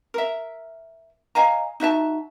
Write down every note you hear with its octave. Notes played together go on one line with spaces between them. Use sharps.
A#4 E5
D#5 F5 G#5 A#5
D#4 F#4 E5 A5